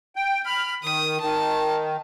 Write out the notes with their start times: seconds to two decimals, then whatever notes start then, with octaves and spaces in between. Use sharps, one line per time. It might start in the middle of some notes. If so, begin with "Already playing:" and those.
0.16 G5
0.46 B5 F6
0.83 D#3 D#6
1.21 D#3 A5